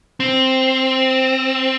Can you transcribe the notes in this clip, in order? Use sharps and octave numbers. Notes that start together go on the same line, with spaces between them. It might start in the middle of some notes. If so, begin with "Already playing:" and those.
C4